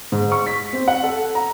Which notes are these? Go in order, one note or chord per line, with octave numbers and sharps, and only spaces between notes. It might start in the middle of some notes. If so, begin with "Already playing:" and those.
G#2
C#6
B6
C4
F#5
A4
A#5